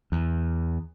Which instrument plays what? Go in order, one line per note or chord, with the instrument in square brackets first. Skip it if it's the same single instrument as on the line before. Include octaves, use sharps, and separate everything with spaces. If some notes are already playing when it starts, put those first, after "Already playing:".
[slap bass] E2